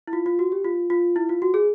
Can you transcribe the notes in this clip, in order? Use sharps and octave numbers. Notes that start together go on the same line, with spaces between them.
E4
F4
F4
F#4
G4
F4
F4
E4
F4
F#4
G#4